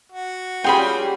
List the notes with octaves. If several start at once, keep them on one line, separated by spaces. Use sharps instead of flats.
F#4
G3 C#4 F4 G#4 G5 B5